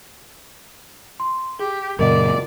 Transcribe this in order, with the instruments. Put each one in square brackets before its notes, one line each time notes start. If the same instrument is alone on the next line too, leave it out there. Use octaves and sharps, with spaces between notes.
[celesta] C6
[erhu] G4 [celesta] G#4
[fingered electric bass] F#2 A#2 C#3 [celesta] A#4 D#5 F#5 [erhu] D5